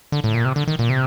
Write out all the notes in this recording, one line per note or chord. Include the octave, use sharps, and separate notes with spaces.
D3
A2
A#2
C3
D3
D#3
A#2
C3